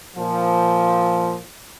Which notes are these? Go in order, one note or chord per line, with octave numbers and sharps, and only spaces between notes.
A#2 F3